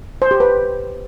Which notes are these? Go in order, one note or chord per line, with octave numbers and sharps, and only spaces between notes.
C5
G4
B4